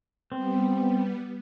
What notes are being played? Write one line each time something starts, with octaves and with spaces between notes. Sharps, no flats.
G3 B3 C4